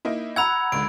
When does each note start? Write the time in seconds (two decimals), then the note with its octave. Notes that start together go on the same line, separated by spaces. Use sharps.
0.05 A#3 D#4 E4
0.36 F#5 A#5 B5 E6 G#6
0.72 C#2 D3 D7